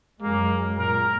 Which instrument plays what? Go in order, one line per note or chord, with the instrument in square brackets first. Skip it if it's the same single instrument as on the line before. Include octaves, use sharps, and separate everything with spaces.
[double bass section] F#2 G#3 [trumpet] A#3
[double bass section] A#2 [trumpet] A#4